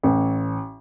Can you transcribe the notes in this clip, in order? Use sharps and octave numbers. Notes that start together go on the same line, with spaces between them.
A1